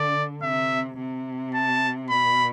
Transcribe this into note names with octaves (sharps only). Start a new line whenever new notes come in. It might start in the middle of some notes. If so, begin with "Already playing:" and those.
Already playing: D3 D5
C3 E5
C3
A5
B2 B5